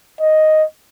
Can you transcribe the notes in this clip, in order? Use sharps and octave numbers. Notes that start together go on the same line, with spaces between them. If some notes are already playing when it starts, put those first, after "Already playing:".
D#5